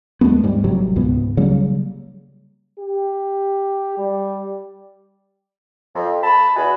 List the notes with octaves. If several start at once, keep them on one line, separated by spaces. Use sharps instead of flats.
D#2 G#3 A3 B3
G#2 G3
A1 C3 F#3 G3
C#2 G#2 B2 B3
C#3 F#3 G3 A#3
G4
G3
F2
A5 B5
E2 F#4 G#4 B5